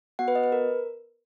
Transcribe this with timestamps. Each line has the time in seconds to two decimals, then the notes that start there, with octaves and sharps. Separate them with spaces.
0.19 B3 F#4 F#5
0.28 B4
0.35 D#5
0.43 B4
0.52 A#4